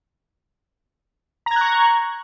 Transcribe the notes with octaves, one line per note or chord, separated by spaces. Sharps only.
A#5 C#6 F#6 G#6